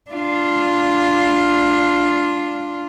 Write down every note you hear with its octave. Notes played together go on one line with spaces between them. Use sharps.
D4 F4